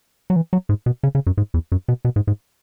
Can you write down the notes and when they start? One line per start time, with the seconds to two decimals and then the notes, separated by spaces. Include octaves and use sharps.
0.30 F#3
0.36 E3
0.53 F#3
0.69 G#2
0.86 B2
1.03 C#3
1.15 C#3
1.27 F#2
1.37 G#2
1.54 E2
1.72 F#2
1.88 B2
2.05 B2
2.16 G#2
2.27 G#2